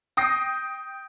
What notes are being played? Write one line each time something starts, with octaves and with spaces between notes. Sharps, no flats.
G5 D#6 A#6 C7